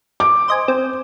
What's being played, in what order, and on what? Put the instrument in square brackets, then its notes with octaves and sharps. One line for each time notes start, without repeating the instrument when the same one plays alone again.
[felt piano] D6
[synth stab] C5 D#5 G#5
C4